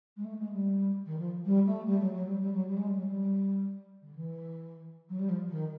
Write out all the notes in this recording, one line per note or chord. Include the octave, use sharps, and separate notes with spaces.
G#3
A3
G#3
G3
D#3
F3
G3
A3
G3
F#3
F#3
G3
G3
F#3
G3
G#3
G3
F#3
G3
D3
E3
F#3
G3
F3
D#3